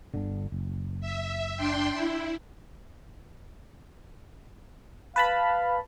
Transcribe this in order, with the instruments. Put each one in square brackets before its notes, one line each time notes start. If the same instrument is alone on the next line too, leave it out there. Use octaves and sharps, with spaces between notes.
[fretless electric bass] G1 D3
F#1
[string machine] E5
D4 G5 C6
E4
[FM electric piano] B4 A5 B5 [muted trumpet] F5